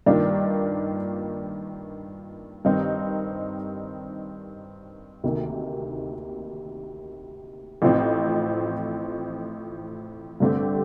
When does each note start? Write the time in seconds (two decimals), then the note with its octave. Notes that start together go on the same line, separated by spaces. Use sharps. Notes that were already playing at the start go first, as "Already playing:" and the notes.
0.06 G2 D#3 A#3 D4 F4
2.65 G2 D#3 G3 C4 D#4
5.24 D2 C3 D#3 A#3
7.82 A1 A2 F3 C4 D#4
10.40 G2 D3 A3 C4 G4